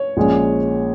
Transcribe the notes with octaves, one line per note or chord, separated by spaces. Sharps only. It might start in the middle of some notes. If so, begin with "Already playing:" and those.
Already playing: C#5
A#1 A#2 G#3 C#4